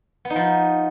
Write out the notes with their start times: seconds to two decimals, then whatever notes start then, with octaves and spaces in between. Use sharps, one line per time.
0.25 B3
0.30 D#4
0.36 F3